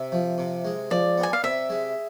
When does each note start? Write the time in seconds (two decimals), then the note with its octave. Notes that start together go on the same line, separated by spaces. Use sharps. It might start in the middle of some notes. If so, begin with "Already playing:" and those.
Already playing: C3 E5
0.12 F3
0.38 C3
0.65 G#3
0.91 F3 D5
1.18 B3
1.23 G#5
1.33 F5
1.44 C3 E5
1.70 G#3